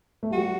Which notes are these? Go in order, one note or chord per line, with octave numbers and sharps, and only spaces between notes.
A3
G3 F#4
F#3